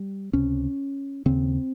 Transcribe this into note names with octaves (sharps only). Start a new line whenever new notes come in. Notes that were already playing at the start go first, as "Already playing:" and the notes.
Already playing: G3
C#2 C3 C#4
D#2 C#3 C4